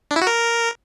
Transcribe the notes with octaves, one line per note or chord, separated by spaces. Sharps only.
D4
E4
F#4
A#4